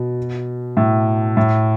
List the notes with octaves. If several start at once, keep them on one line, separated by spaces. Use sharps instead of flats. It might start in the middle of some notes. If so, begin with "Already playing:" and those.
Already playing: B2
A2
A2